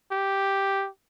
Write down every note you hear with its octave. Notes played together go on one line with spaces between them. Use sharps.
G4